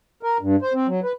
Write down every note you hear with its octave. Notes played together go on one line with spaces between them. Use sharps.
A#4
G2
C5
C4
F#3
B4